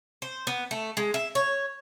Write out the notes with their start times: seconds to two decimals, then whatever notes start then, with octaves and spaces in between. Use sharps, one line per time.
0.22 C5
0.47 B3
0.71 A3
0.97 G#3
1.14 E5
1.35 C#5